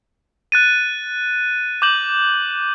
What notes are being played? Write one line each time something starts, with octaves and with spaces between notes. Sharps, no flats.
F#6 A6 D#7
D6 G6 F#7